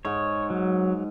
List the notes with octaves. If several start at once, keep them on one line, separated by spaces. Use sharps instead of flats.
G#2 C#5
F#3